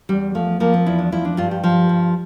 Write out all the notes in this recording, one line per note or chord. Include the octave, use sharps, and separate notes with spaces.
E2 G3
F3 A3
F3 A#3
C4
E2 E4
D4
F3 E4
D4
G2 F4
G4
F3
G2